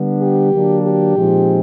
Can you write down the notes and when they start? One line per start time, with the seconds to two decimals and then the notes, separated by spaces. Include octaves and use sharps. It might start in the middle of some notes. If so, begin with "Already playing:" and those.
Already playing: D3 G3 B3 D4
0.21 G4
0.53 D3 F#3 A#3 D4
0.83 G4
1.16 A#2 F3 G#3 C4 D#4